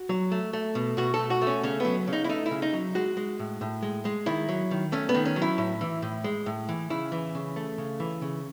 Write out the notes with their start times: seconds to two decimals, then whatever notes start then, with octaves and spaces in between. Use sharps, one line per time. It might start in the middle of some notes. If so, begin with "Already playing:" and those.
Already playing: F#4
0.09 F#3
0.32 A3
0.53 A3
0.75 B2
0.97 B2 F#4
1.14 A4
1.19 A3
1.30 F#4
1.41 A3
1.47 C#4
1.63 C#3 C#4
1.80 F#3 B3
2.08 C#3
2.13 D#4
2.24 E4
2.29 A3 D#4
2.46 E4
2.51 C#3
2.62 D#4
2.73 F#3
2.95 G#3 F#4
3.17 G#3
3.39 A2
3.61 A2
3.83 G#3
4.05 G#3
4.26 D#3 E4
4.49 F#3
4.71 D#3
4.92 A3 C#4
5.09 B3
5.14 D#3
5.25 C#4
5.36 F#3
5.42 E4
5.58 A2
5.81 E3
6.02 A2
6.24 G#3
6.46 A2
6.69 E3
6.90 C#3 E4
7.12 E3
7.35 C#3
7.56 A3
7.78 C#3
8.00 E3
8.22 C#3